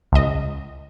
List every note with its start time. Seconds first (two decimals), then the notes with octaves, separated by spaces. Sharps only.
0.12 C#2 D#5